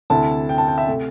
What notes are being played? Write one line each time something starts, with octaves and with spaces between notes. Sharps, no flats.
D2 C3 A3 E4 A5
G5
A5
G5
E5
C3 A3